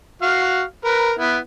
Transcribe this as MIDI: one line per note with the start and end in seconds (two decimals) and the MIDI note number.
0.22 0.63 66
0.22 0.63 77
0.22 0.63 89
0.85 1.12 70
0.85 1.12 71
1.19 1.37 59
1.19 1.37 64